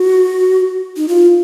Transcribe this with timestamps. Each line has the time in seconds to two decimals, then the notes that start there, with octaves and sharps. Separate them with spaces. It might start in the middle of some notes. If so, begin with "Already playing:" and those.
Already playing: F#4
0.97 D#4
1.08 F4